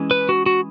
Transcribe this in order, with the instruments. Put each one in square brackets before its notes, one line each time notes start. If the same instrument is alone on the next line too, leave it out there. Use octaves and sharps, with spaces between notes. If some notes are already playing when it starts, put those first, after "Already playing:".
Already playing: [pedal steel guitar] E3 G#3 C#4
B4
F#4
F#4